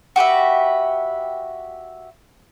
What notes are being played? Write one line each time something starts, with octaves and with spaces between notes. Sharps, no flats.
F#4 G4 B4 E5